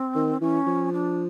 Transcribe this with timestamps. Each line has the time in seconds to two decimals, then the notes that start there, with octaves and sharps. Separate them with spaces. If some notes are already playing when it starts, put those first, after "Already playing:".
Already playing: C4
0.15 D#3
0.41 E3 C#4
0.67 F3
0.93 D4